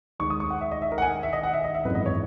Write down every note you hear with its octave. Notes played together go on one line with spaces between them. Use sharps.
D#2 D#3 G#3 C#6
D#6
C#6
F#5
E5
D#5
E5
A#4
F#5
G#5
E5
D#5
F#5
E5
D#5
E5
G#1 F#2 E3 G#3 D#4 B4
D#5
C#5